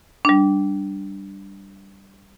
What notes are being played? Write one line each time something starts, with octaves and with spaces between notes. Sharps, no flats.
G3 D4